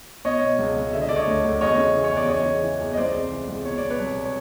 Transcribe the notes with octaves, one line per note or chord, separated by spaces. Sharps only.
B2 C#5 D#5
B2
C#2
C#2
D3 E5
D#5
D3 D5
C#5 D#5
D2
D2
E2 C#5 D#5
C#3
E3
C#5
E2 D5
E2 C#5 D#5
C#3
E3
E2
D#5
C#2 C5 D5
C3
E3
C#2
B2 C#5
B2 D5
B4 C#5
C2
C#5